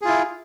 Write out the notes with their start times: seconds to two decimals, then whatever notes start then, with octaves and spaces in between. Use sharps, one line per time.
0.02 G#4
0.05 F4
0.08 E4